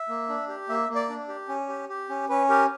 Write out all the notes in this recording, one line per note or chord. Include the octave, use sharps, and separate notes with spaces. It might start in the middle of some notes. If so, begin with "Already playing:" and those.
Already playing: E5
A#3
D4
G4
A#3 E5
A#3
D5
D4
G4
C#4
G4
G4
C#4
C#4 B4
G4 A#4